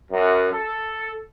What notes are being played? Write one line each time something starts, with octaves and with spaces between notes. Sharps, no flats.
F#2
A4